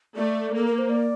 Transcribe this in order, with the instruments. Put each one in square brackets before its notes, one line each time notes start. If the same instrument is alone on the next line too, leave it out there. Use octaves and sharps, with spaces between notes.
[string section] A3 [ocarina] D5
[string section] A#3 [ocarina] A4
[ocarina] A#4
C5
D5